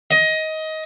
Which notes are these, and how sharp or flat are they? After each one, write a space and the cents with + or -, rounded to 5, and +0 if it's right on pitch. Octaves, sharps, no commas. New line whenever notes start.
D#5 +20